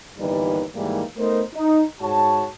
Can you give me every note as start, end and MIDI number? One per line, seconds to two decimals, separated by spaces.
0.18 0.64 31
0.18 0.64 39
0.18 0.64 52
0.18 0.64 55
0.18 0.64 63
0.18 0.64 71
0.75 1.02 44
0.75 1.02 51
0.75 1.02 52
0.75 1.02 55
0.75 1.02 56
0.75 1.02 58
1.18 1.42 57
1.18 1.42 59
1.18 1.42 63
1.18 1.42 70
1.18 1.42 72
1.55 1.83 63
2.01 2.46 44
2.01 2.46 66
2.01 2.46 73
2.01 2.46 81